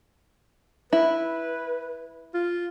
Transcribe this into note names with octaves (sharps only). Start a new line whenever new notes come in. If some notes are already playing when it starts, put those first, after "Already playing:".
E4 B4
F4